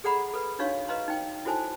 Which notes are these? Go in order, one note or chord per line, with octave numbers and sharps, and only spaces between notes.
G#4 A4 D5 F#5 A#5 B5
A4 B4
D4 D#4 F#4 C#5 F5 C#6
B4 D#5 F5 A#5 C6
D#4 G5
E4 F#4 A4 C5 G#5 A5